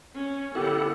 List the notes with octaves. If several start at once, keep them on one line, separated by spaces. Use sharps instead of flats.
C#4
D3 A#3 B3 E4 G4 A4 F#5